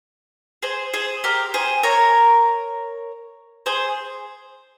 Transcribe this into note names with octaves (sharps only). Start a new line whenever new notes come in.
G#4 C5
G#4 C5
G4 A#4
G#4 C5
A#4 C#5
G#4 C5